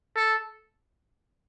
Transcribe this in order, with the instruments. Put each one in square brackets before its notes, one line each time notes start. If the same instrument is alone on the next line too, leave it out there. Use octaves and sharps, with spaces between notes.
[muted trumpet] A4